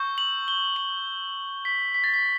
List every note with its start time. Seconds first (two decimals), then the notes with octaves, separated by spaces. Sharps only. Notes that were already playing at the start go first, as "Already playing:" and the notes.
Already playing: C#6 E6 G6
0.18 F#7
0.48 G7
0.76 F#7
1.65 B6
1.94 B6
2.04 A6
2.14 B6